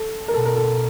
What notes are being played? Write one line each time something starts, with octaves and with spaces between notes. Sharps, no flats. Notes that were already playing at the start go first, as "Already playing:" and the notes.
Already playing: A4
A#4
B2 A4
A#4
A4